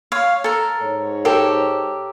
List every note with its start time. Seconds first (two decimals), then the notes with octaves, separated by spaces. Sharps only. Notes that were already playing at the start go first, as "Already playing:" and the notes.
0.12 C#5 F5
0.44 A4 A#4
0.82 G#2 C#5
1.25 G4 A4 A#4